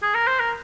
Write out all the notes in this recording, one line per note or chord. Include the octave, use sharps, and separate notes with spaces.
G#4
A#4
C5
A#4